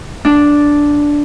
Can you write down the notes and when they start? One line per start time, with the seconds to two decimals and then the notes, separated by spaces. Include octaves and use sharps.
0.25 D4